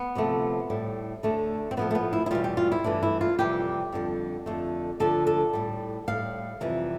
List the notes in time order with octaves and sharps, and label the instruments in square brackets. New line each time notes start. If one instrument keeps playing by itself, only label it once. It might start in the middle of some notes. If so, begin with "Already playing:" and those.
Already playing: [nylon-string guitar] B3
D2 C3 F3 A3
A2 G3
D2 D3 A3
C4
A2 F3 A3 B3
A3
B3
E4
E4
E2 B2 G3 F4
G4
F4
E4
G2 E3 A3 D4
E4
F4
F2 C3 E3 G3 G4
F2 D3 G3
F2 D3 A3
D2 D3 F3 A4
A4
A2 G3
A2 G3 F5
F2 C3 E3 G3